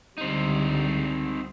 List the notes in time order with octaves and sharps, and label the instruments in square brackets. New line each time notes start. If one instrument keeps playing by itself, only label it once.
[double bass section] C#2 D3 G3 [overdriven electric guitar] C4 D#4